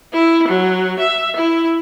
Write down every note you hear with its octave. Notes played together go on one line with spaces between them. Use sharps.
E4
F#3
E5
E4